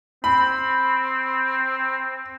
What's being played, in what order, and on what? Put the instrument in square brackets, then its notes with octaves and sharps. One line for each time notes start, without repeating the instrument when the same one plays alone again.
[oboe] C4 [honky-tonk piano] B5